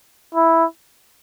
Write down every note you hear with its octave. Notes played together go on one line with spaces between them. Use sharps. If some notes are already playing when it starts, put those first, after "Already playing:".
E4